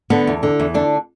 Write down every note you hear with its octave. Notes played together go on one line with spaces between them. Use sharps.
D3 B3
E2
D3
E2
D3 D4